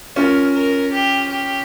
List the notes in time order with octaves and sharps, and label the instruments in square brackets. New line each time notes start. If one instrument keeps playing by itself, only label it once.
[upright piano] C#4 F4 [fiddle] A#4
[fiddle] A#4
G4
G4